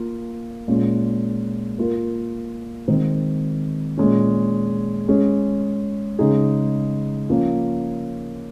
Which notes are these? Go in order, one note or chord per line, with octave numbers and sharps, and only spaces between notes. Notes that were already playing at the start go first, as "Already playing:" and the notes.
Already playing: A#3 F4
A#2 G#3 C#4
A#3 F4 A#4
D#3 G#3 C4 D#4
A#2 G#3 C#4
G#3 C#4 G#4
C#3 G#3 D#4 G#4
F3 A#3 C#4 F4